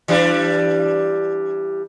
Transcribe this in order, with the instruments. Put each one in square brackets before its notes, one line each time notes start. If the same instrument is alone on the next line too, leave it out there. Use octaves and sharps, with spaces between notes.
[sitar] E3 G3 D4